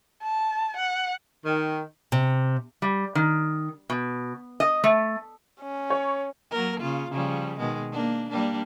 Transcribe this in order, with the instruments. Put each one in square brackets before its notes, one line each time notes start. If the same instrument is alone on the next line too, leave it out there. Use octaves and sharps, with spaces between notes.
[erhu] A5
F#5
[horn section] D#3
[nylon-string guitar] C3
[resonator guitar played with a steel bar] G3
D#3
B2
D#5
A3
[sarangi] C#4
[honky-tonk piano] C#5
[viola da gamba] F#3 A#3 A#4
C#3 F4
C#3 F3 G3
B2 D#3 G#3
A#3 D4
G3 A#3 D4